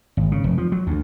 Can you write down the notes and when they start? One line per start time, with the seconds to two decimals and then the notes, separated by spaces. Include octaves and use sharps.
0.17 G#1
0.32 C#3
0.44 F1
0.58 F3
0.72 F#3
0.87 D2